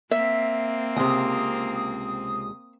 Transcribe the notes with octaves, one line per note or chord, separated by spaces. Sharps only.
A#3 C4 E5
C#2 C3 D#6